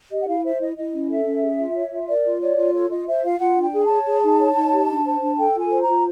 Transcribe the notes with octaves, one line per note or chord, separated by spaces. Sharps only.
G4 D#5
F#5
E4 F5
C5 E5
E4 D#5
E4 D#5
C#4
A4 E5
C#4
G#4
F4
C#5
F4
A#4 D5
F4
C#5 D5
F4
A4 C#5
F4 D#5
C5 E5
F4 F5
F4 F#5
D4
G5
G#4
A5
C#5
G#4
D#4
C#5
D#4
G4
D4
C5
D4
A4 G5
F4 G#5
C5
A#5
F4